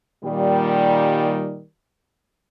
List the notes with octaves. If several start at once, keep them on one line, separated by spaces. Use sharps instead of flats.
A#2 D#3 G3